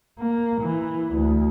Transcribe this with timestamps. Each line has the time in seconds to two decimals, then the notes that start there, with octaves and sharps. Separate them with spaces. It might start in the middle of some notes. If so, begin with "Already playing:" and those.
0.19 A#3
0.62 E3
1.14 D2